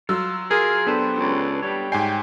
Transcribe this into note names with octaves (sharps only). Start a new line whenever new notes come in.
F#3 F4 E6
F4 G#4 A#4
B3 D4 G4 A4 B4 C5
C#2
G3 G4 C#5
G#2 G5 G#5 C7